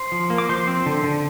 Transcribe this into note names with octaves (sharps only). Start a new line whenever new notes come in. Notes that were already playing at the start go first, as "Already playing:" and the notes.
Already playing: C5 C6
F3
A#3
D6
F3 C5 C6
C4
D3
D3